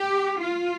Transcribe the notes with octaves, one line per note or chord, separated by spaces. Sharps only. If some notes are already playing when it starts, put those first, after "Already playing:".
Already playing: G4
F4